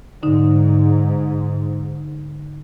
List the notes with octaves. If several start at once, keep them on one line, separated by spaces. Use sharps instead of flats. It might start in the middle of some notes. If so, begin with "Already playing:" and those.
G#2 D3 D#4